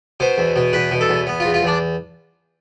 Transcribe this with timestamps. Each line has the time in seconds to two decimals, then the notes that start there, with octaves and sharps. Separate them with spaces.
0.20 B2 C5
0.38 E2
0.56 B2
0.73 E2 B4
0.91 B2
1.01 A4
1.09 E2
1.27 B3
1.40 F4
1.45 E2
1.54 F4
1.63 E2 D4